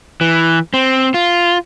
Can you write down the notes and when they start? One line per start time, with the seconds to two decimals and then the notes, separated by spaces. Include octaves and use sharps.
0.21 E3
0.74 C4
1.14 F4